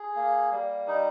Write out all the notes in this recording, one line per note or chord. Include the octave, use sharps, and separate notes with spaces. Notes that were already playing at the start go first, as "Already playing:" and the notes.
Already playing: G#4
A#3
G3
D#4